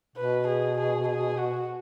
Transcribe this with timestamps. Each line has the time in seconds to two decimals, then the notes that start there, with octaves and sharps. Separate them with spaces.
0.16 B2 B4
0.47 G#4
0.78 G#4
1.08 G#4
1.38 F#4